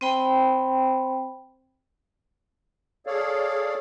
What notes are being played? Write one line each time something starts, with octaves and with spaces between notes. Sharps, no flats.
C4 C5 G5 B5
G#4 A4 C#5 D5 F5